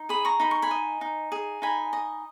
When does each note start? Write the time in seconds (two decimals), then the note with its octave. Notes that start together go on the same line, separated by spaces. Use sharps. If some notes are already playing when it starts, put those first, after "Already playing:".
Already playing: D#4
0.09 G#4 B5 D#6
0.25 A#5 C#6
0.40 D#4 B5
0.51 C#6
0.62 G#5 B5
0.71 D#5
1.01 D#4
1.32 G#4
1.62 D#4 G#5 B5
1.93 D#5